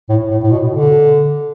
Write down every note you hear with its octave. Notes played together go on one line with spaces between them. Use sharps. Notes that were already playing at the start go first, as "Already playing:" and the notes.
A2
A2
A2
B2
D3